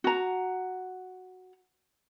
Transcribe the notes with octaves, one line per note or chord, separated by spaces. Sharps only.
F#4 A#5